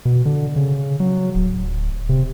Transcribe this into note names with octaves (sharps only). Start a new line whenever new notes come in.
B2
D3
C#3
F#3
D1
C3